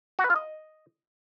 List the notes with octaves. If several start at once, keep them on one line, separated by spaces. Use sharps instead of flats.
F#4
B4
F4
D#5